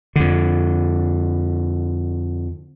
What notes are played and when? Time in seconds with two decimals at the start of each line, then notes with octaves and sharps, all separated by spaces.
0.16 F2 D3